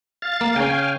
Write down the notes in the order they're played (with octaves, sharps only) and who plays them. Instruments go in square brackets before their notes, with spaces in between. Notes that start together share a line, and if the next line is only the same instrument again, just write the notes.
[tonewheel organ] F5 A6
[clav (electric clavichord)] A#3
[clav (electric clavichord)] C#3 C#4 [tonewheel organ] F5 G5 G#5